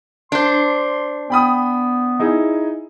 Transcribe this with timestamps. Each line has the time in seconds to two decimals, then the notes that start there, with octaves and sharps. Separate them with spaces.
0.32 D4 C5 C6
1.30 B3 G5 B5 D#6
2.19 D#4 E4 G#4